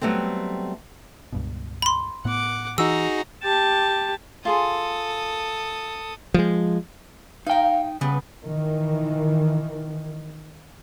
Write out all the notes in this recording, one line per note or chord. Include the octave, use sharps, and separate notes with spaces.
F#3 G3 A3 B3 C4
C#2 G2 B2
B5 C6
A2 B3 F#5 D6
E3 D#4 F#4 G#4 A#5 E6
G4 A5
F4 G#4 A4 C6 D#6
F3 G3 G#3
D#4 A#4 F5 G5
C#3 G3 B3
D#3 E3